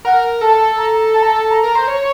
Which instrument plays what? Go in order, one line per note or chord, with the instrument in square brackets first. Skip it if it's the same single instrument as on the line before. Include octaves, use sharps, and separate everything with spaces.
[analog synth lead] A#4 [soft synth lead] F#5
[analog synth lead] A4 [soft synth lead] A5
[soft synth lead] A#5
A5
A#5
A5
A#5
[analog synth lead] A#4
C5
C#5